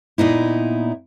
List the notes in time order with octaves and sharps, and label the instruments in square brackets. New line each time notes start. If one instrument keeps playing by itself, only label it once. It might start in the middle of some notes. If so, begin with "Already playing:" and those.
[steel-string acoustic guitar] A#2 B3 D#4 E4